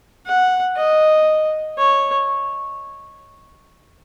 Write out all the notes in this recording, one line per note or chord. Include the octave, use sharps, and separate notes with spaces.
F#5
D#5
C#5